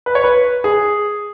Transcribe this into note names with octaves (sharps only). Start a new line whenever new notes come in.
B4
C#5
B4
G#4